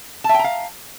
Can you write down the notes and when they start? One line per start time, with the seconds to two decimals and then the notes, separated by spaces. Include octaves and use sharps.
0.24 A5
0.29 E5
0.34 G5
0.39 A#5
0.44 F5